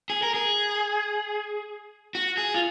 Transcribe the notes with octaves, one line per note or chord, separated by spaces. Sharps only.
G#4
A#4
G#4
F#4
G#4
F4